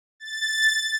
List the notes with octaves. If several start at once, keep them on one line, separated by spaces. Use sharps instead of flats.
A6